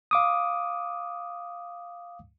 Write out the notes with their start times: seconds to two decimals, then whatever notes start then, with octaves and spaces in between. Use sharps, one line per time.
0.11 F5 D6 D#6